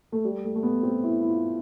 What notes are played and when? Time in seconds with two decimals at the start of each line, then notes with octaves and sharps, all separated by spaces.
0.12 A3
0.24 G3
0.44 A3
0.55 A3
0.63 B3
0.83 C4
1.04 E4
1.21 E4
1.30 F4